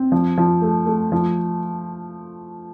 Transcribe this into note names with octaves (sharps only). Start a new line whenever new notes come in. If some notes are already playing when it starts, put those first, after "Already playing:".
Already playing: C4
F3
F3
A3
A3
F3